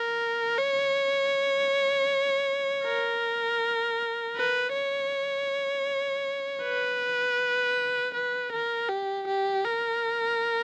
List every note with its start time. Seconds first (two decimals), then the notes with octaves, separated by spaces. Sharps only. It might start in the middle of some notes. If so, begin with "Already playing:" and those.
Already playing: A#4
0.58 C#5
2.84 A#4
4.37 B4
4.73 C#5
6.63 B4
8.14 B4
8.52 A#4
8.89 G4
9.28 G4
9.65 A#4